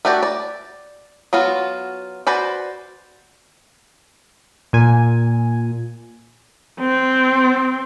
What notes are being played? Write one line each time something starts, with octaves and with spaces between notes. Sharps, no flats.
A3 D4 F#4 G4 D5
D5
F#3 B3 F4 F#4
F#4 B4 C5 D5
A#2 G#5
C4